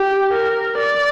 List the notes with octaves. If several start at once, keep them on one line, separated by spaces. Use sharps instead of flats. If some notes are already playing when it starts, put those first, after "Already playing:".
Already playing: G4
A#4
D5